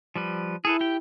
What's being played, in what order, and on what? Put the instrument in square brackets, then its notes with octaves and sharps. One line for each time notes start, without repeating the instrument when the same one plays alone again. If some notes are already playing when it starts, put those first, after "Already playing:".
[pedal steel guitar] F3 G3 B4
[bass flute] E4 [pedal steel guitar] G#4 A4 B4
[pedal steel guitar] G4 G5